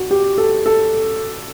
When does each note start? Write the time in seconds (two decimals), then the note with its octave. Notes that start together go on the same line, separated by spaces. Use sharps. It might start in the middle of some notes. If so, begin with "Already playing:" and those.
Already playing: F#4
0.11 G4
0.38 A4
0.66 A4